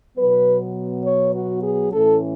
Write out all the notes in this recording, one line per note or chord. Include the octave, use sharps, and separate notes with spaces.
B2 F#3 B3 B4
C#5
F#4
G#4
A2 E3 A3 C#4 A4